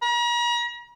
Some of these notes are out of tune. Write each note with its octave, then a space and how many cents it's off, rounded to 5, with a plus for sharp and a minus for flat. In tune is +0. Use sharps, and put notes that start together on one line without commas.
A#5 +45